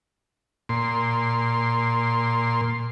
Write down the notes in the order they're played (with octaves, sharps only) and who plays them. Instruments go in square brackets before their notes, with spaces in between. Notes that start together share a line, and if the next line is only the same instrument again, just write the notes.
[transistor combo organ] A#2 C6